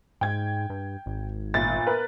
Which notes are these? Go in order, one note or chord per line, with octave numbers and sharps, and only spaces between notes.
G#2 G5 G#6
G2
G#1
G1 A#2 A6
A#4 B4